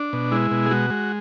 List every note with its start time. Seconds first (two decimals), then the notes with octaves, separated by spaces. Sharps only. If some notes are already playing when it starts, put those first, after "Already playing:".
Already playing: D4
0.13 B2
0.32 G#3 E4
0.51 B2
0.66 G#4
0.71 G#3 F#4
0.90 G#3